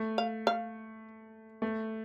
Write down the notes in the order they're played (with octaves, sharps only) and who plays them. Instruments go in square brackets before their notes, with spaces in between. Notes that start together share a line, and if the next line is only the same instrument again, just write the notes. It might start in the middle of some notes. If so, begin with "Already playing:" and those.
Already playing: [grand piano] A3
[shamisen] F5
F5
[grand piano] A3